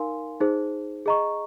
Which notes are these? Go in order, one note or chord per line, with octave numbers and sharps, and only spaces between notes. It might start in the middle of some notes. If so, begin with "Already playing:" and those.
Already playing: D#4 A#4 F5 G#5 C6
D#4 G#4 C5
G#4 D#5 A#5 C#6